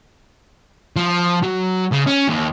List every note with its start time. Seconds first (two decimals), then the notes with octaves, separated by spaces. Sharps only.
0.96 F3
1.43 F#3
1.93 C#3
2.07 C#4
2.28 D#2